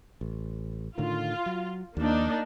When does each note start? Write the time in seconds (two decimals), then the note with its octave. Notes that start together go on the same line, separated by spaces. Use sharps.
0.21 A1
0.98 A2 D3 D#3 F4
1.46 F#3
1.97 D#2 F3 A#3 D4 D#4